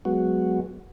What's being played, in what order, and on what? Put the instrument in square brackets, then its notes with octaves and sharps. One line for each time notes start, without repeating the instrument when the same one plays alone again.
[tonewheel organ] F#3 G#3 B3 F#4